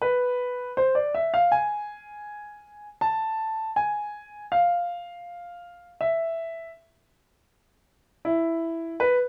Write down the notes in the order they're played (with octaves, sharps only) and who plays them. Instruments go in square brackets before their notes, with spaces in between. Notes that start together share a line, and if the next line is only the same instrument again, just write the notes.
[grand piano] B4
C5
D5
E5
F5
G#5
A5
G#5
F5
E5
E4
B4